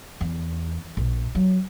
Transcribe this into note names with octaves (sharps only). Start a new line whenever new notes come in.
E2
A#1
F#3